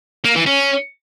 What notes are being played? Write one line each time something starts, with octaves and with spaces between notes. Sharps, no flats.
A#3
E3
C#4